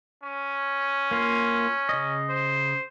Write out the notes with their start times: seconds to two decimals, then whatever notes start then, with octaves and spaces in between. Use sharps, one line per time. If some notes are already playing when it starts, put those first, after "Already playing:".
0.24 C#4
1.11 A#3 F4
1.89 C#3 D#5
2.30 C5